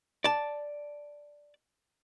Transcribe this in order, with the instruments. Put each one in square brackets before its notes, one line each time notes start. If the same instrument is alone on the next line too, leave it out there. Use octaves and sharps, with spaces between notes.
[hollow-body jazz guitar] D5 A5